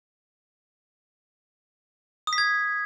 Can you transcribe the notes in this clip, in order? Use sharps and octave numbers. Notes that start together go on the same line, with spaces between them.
D#6
B6
G#6